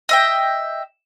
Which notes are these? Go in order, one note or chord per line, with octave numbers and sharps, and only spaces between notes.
D#5 E5 G5